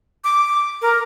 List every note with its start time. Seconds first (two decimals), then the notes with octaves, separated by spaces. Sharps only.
0.24 D6
0.82 A#4